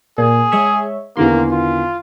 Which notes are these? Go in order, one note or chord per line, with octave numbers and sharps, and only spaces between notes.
A#2 G#4
G#3 C#5 E5
E2 D3 D#3 A#3 C6
F4